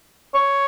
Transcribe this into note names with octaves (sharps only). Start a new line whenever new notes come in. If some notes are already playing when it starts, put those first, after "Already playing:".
C#5